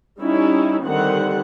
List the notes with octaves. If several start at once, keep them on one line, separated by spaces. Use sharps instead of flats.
G3 C#4 D#4 E4
D3 D#3 G3 C4 F#5